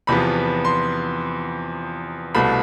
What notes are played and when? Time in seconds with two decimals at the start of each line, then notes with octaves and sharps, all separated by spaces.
0.07 E2 C3 F3 B3 B5
0.65 C6
2.35 C2 B2 A3 B5